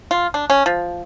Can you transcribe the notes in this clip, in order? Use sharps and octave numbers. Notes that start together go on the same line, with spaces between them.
F4
D4
C#4
F3